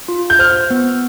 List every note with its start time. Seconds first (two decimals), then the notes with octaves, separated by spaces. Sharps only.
0.08 F4
0.30 G6
0.39 C5 F6
0.70 B3